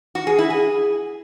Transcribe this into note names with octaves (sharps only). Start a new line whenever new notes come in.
F#4
G#4
E4
G#4